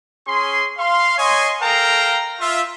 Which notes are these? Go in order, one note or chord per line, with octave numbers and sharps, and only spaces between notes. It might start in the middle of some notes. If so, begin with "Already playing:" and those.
C#4 G#4 C6
F5 C6
C#5 D#5 G#5 C6
A4 A#4 F5 G5 A#5
F4 E5